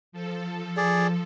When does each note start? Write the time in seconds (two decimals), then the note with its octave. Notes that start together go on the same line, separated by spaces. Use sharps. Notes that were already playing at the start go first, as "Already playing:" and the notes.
0.12 F3 A4
0.77 G#4 D5